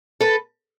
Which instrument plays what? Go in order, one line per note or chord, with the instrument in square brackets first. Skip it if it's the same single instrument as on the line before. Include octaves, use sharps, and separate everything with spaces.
[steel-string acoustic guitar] A4 B4